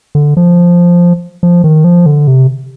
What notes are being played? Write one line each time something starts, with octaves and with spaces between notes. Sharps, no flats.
D3
F3
F3
D#3
F3
D3
C3